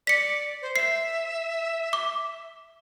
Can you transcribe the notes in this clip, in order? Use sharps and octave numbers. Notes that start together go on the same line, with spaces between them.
D5 B6 C#7
C5
E5 C7
D6